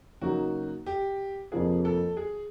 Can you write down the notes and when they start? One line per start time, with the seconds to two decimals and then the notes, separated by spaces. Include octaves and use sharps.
0.22 C#3 F#3 A#3 D#4 F#4
0.86 G4
1.52 F2 C3 F3 A#3 G#4
1.85 A4
2.17 G#4